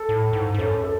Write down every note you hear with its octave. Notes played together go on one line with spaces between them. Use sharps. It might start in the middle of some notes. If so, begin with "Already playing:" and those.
Already playing: A4
A2
G#2
G#2
F#2 A4 C#5
A4